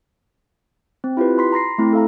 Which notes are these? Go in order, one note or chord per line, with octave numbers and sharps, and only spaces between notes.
C4
E4 F4 G4 B4
B5 C6 B6
A#5 C6 A#6 C7
A3 C4 E4 A#5
A4 F5 A#5